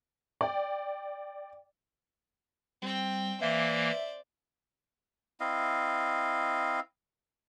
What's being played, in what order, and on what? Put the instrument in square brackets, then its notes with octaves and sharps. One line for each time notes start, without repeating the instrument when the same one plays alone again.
[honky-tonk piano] D5 G5
[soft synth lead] G3 [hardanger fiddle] C4 G5
[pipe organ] E3 A#3 [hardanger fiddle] C5 D5 [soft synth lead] E5
[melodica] C4 E4 D#5 F5